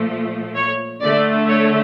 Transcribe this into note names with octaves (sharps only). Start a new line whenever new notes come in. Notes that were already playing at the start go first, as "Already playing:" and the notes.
Already playing: A#2 F3 A3
C#5
D3 A3 D5
C#5